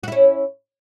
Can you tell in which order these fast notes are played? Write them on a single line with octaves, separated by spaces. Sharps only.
F#4 E4 C#4